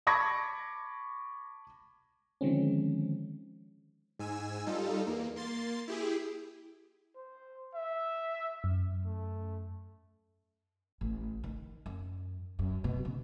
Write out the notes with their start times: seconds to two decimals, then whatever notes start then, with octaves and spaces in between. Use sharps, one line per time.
0.07 A5 B5 C#6 D6 G#6 A#6
2.41 D3 D#3 F3 G#3 C4 C#4
4.19 G#2 G#5 E6
4.66 G3 D#4 F4 A4
5.07 E2 A#3
5.36 A#3 C6 A6
5.88 E4 G4 G#4
7.16 C5
7.75 E5
8.64 F#2
9.05 A3
11.01 A1
11.44 D#3
11.86 F#2
12.59 F#2
12.84 B2
13.05 D3